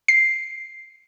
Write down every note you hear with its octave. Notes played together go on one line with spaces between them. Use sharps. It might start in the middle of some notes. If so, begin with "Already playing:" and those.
C7